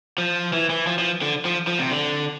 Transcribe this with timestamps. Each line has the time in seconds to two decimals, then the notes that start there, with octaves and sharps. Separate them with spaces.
0.18 F3
0.53 E3
0.70 E3
0.87 F3
0.98 F3
1.22 D3
1.45 F3
1.67 F3
1.79 C3
1.91 D3